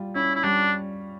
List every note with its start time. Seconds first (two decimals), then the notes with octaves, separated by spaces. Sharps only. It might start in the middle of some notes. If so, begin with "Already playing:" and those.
Already playing: G3 F4
0.15 C#4 E4
0.35 E4
0.43 G3 D4